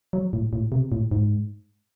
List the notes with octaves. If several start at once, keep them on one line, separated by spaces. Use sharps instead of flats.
F#3
A2
A2
C3
A2
G#2